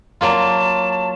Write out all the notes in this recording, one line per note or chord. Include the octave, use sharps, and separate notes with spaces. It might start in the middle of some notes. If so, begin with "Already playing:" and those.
F#3 A#3 F4 A5